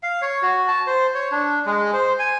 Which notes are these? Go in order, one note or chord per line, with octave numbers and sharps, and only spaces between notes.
F5
C#5
F#4
A5
C5
C#5
D4
G#3
C5
G#5